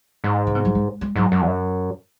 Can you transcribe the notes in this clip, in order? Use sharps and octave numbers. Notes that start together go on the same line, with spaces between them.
G#2
C#3
B2
F#3
G#3
G#3
G#2 F#3
F#2
E2
F#2